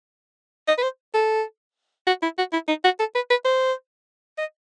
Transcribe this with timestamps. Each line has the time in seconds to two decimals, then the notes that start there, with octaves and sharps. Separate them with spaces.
0.68 D#5
0.78 B4
0.83 C5
1.14 A4
2.07 F#4
2.23 E4
2.38 F#4
2.53 E4
2.68 D#4
2.84 F#4
2.99 A4
3.15 B4
3.30 B4
3.45 C5
4.38 D#5